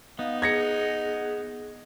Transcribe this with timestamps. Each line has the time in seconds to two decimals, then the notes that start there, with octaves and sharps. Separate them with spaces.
0.19 B3 D#4 F5
0.42 G#4 G#6 A#6 C#7